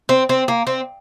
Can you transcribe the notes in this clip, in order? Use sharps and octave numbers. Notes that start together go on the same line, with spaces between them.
C4
C4
A#3
C4